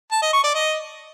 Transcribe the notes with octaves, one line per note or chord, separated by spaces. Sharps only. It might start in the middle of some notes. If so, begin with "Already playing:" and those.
A5
D#5
C#6
D5
D#5